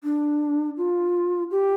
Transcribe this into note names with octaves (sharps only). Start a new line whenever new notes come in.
D4
F4
G4